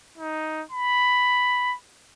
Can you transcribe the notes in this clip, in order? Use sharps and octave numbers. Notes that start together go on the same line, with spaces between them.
D#4
B5